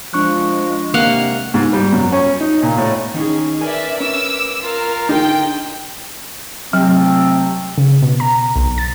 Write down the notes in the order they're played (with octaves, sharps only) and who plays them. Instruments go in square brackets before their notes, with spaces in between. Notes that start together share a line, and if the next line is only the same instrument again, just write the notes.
[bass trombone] F3 [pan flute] G#3 [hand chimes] D4 C#6 F#6
[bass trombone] C3 [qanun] A#3 F5 F#5
[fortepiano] G#2
G3
F#2
C#4
D#4
A#2
A2
[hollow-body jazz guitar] D#3 D#4 [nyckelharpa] C#4 G#4
[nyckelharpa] A#4 B4 [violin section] D5 E5 [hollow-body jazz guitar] G#5
[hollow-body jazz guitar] C#4 [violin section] D6 E6
[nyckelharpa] F4 [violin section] A#4
[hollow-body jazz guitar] D3 [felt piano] D#4 G#4 A#4 [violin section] G5
[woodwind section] C3 A3 C4 [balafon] F#3
[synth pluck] C#3
B2
A#5
B1
A6